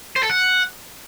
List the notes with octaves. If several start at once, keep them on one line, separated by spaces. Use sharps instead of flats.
C5
A4
F#5